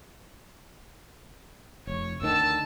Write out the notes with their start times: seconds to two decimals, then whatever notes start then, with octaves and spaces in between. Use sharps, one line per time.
1.87 F1 C#5
2.22 D2 D3 D#3 A5 E6